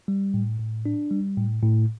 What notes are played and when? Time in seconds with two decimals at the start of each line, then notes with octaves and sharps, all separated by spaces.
0.08 G3
0.34 A2
0.60 A2
0.86 D4
1.11 G3
1.37 A2
1.63 A2